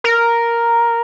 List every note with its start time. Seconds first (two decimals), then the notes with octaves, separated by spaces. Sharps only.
0.04 A#4